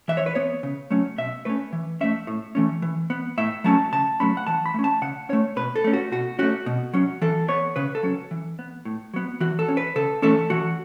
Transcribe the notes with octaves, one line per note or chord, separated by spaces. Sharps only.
E3 E5
C#5
B4
B3 C#5
C#3
F#3 A3 C#4
B2 E5
A3 C#4 B4
E3
A3 C#4 E5
A2
E3 A3 C#4
E3
B3
A2 E5
F#3 A3 C#4 A5
C#3 A5
F#3 A3 C#4 B5
F#5
E3 A5
B5
A3 C#4
A5
C#3 F#5
A3 C#4 C#5
B2 B4
A4
A3 C#4
F#4
B2 F#4
A3 C#4 F#4
B2
F#3 C#4
E3 A4
B3 C#5
C#3 B4
A4
F#3 C#4
E3
B3
A2
F#3 B3
E3 F#4
A4
C#4
B4
C#3 A4
E3 A3 C#4 A4
E3 F#4